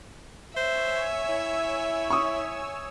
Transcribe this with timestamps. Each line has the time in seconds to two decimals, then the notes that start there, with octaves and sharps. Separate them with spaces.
0.56 C5 C#5 E5 G#5 E6
1.29 E4
2.10 C#6 D#6